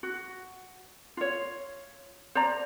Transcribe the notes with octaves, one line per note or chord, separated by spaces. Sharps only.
F#4
F4 C#5
C5 D5 A#5